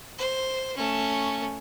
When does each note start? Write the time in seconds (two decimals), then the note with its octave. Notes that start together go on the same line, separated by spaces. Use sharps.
0.18 C5
0.77 A3 C#4